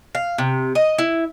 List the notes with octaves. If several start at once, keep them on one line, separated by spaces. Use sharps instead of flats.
F5
C3
D#5
E4